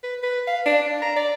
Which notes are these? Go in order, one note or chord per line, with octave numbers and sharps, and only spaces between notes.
B4
B4
F5
D4
D4
A#5
D5